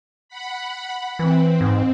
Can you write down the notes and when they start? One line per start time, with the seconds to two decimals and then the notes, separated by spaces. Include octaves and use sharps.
0.29 F#5 B5
1.19 E3 C4
1.61 G#2